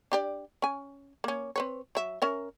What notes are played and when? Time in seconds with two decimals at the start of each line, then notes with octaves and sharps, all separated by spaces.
0.12 D4 G4 D5
0.62 C#4 G#5
1.24 A#3 C#4
1.56 C4 B4 C#5
1.95 F#3 E5
2.22 C#4 A#4 E5